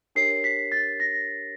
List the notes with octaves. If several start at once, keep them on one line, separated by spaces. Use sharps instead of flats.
D4 G4 A#4 C#5 C7
B6
A6
A#6